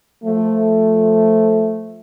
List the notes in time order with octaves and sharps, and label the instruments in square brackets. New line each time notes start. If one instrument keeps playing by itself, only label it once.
[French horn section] F3 A3